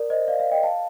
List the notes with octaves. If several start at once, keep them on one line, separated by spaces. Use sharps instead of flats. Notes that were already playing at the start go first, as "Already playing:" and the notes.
Already playing: A#4 D5
C5 D#5
D5 F5
D5 F5
D#5 G5
F5 A5